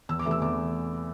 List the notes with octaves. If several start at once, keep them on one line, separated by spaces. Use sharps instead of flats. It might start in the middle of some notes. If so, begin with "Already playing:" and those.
E2 E6
D6
C3 E3 A3
E6
E2 D6